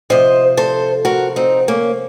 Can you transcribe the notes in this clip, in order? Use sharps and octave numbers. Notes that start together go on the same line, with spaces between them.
C3 F3 C5 D#5
A4 C5
F#4 A#4
C4 D#4
A#3 C#4